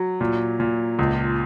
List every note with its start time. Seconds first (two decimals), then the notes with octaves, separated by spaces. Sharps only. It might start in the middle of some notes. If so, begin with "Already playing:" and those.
Already playing: F#3
0.21 A#2
0.60 A#2
0.99 C#2